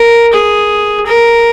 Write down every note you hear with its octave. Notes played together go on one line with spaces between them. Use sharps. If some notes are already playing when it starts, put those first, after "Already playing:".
Already playing: A#4
G#4
A#4